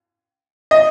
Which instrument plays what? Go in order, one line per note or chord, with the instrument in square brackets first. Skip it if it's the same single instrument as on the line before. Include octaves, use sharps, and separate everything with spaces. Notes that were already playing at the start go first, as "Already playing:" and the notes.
[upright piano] D#5